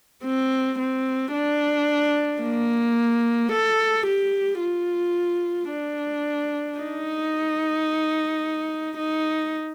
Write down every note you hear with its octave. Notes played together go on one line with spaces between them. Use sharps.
C4
C4
D4
A#3
A4
G4
F4
D4
D#4
D#4